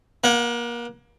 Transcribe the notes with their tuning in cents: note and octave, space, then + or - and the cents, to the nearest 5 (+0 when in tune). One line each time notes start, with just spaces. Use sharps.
A#3 +30 F#5 +0